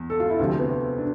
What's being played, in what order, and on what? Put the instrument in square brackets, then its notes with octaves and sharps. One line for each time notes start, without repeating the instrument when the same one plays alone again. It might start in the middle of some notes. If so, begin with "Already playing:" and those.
Already playing: [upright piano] E2
A4
F4
E4
D2 C3 F3
C4
B3
C4
D4